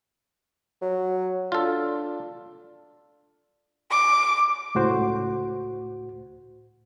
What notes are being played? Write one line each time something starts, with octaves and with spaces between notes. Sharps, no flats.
F#3
D4 F4 A4
D6
C#2 A2 F#4 C5